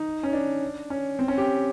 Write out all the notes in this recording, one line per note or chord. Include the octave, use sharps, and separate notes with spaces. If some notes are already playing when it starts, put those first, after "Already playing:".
Already playing: D#4
C#4
D4
C#4
C4
C#4
G4